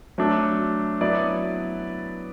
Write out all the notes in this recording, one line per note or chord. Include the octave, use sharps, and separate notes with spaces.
F#3 A3 D4
F#3 B3 E4 B4 D5